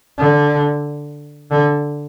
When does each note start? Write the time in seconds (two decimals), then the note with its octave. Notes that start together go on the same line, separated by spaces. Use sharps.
0.18 D3
1.51 D3